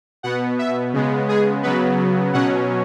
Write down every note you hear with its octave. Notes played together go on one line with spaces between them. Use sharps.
B2 B3 F#5
E5
C#3 G#3 B3
G#4
C#3 F#3 B3 B4
B2 F#3 C#4 F#5